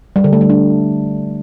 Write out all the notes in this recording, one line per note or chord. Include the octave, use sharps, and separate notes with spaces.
G3
D3
A3
G3
D4